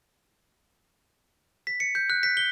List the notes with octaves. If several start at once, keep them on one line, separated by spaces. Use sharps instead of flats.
B6
C#7
G6
F#6
B6
G7